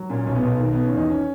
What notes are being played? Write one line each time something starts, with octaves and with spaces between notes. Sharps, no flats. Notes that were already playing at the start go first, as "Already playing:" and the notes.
Already playing: F#3
A#2 C#4
B1 C#4
B3
B1
D#3 A#3
D#3 B3
C#4
E2 D#4
C#4